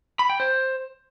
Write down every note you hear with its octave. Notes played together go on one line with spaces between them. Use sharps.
B5
G5
C5